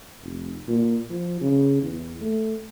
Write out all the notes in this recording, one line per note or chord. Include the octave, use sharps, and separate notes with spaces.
F1
A#2
F3
C#3
E2
A3